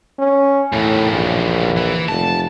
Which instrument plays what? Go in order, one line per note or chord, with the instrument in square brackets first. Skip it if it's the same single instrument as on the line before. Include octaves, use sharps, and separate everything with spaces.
[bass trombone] C#4
[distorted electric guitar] D#2 E3 [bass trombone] A2
[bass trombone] A#1
[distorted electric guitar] E3
[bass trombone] F1 [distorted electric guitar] A5